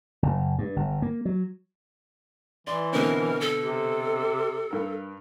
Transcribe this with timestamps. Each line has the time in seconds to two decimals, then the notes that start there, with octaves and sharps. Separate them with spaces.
0.23 F#1
0.59 G2
0.76 G1
1.02 A#3
1.25 F#3
2.67 E3 D5 C6
2.93 B2 D3 C4 A#4
3.41 A4
3.61 C3
4.71 G2 A#4